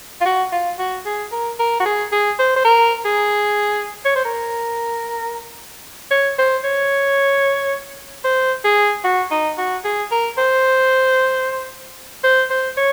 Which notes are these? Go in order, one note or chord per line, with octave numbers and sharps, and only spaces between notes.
F4
F#4
F4
F#4
G#4
A#4
A#4
F#4
G#4
G#4
C5
C5
A#4
G#4
C#5
C5
A#4
C#5
C5
C#5
C5
G#4
F#4
D#4
F#4
G#4
A#4
C5
C5
C5
C#5